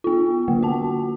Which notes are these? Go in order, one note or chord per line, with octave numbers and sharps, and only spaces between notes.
B3 F4
D3 A#3
F#4 A5